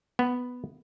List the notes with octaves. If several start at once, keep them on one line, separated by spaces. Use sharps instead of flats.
B3